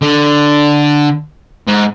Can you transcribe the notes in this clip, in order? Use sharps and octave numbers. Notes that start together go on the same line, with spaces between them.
D3
G#2